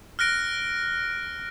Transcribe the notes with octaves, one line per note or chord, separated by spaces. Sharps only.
F6 F#6 A#6 D7